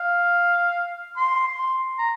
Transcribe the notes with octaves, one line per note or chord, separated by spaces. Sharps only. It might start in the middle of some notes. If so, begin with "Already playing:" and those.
Already playing: F5
C6
C6
A#5